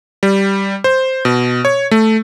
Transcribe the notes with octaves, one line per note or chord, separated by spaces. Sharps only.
G3
C5
B2
C#5
A3